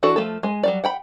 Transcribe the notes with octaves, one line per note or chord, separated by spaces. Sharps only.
E3 D4 F#4 A4 D5
F3 A3 A4
G#3 G#5
F#3 G3 D5
F#5 G5 B5